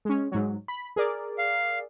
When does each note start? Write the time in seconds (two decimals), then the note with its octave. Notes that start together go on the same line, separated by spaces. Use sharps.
0.05 G#3 C#4
0.32 G#2 F#3
0.68 B5
0.96 G#4 A#4 D5
1.38 F5